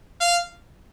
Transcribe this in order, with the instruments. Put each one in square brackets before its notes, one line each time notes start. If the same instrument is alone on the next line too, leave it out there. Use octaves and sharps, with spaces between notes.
[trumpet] F5